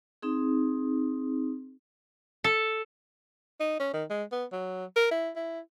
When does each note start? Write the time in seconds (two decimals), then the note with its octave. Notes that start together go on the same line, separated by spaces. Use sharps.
0.22 C4 D#4 G#4
2.44 A4
3.60 D#4
3.80 C#4
3.93 D#3
4.10 G#3
4.32 B3
4.52 F#3
4.96 A#4
5.11 E4
5.35 E4